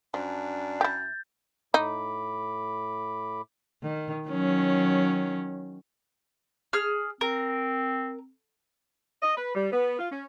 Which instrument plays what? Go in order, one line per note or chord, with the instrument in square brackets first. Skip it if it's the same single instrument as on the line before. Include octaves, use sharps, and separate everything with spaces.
[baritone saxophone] F#2 [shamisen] F3 [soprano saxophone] D4
[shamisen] E4 G4 [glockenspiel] G6 A6
[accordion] A2 B5 D6 [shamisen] D#4
[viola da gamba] D#3
D#3 F#3 C#4
[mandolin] G#4 F6
[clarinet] C4 [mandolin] A#4
[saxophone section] D#5
B4
G3
B3
F4
C#4